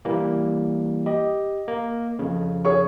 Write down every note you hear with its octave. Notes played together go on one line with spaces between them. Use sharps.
E3 G3 A#3
G4 D#5
A#3
F2 C#3
G#4 C#5 C#6